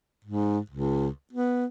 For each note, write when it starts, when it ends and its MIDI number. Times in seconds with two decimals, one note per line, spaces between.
0.25 0.59 44
0.70 1.09 37
1.33 1.66 59